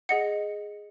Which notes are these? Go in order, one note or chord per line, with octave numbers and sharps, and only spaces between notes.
G#4 D#5 F#5 C#7